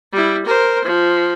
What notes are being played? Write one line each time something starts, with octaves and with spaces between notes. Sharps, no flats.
G3 E4
A#4 C5
F3